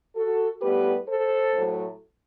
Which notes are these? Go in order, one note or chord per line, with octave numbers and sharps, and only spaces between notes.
F#4 A4
A2 G3 B3 G4 B4
A4 C5
A2 F#3 A3